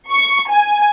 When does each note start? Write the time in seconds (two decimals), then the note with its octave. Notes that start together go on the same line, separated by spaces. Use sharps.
0.11 C#6
0.49 G#5